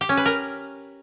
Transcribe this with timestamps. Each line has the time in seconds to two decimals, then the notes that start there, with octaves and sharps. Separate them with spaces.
0.01 G4
0.09 C#4
0.17 B4
0.26 A#4